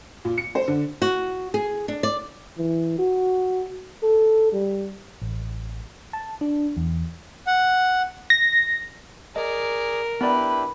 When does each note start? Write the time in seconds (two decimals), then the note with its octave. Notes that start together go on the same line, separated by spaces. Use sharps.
0.25 A#2
0.38 C#7
0.55 C5
0.68 D3
1.02 F#4
1.54 G#4
1.88 D4
2.03 D5
2.58 E3
2.98 F#4
4.03 A4
4.52 G3
5.22 A1
6.13 A5
6.41 D4
6.77 E2
7.47 F#5
8.30 A#6
9.36 G#4 A#4 D5 D#5
10.21 B3 D4 E4 G4 B4 D5